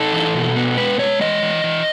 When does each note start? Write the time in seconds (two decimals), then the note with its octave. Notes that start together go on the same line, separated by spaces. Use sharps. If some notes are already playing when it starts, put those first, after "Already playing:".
Already playing: D#4 A4
0.13 E3
0.34 B2
0.56 B3
0.77 G#3 B4
0.99 G#3 C#5
1.21 E3 D#5
1.42 E3
1.64 E3